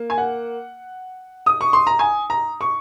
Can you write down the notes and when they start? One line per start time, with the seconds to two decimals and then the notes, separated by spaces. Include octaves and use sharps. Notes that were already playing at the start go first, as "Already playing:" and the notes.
Already playing: A#3
0.10 G#5
0.18 F#5
1.46 D#6
1.61 C#6
1.73 C6
1.87 A#5
1.99 G#5
2.30 A#5
2.61 C#6